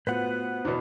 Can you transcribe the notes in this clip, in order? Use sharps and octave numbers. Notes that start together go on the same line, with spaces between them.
A2 B3 F4 F#4 B4 C5 F#5
E2 B2 F#4 C5 C#5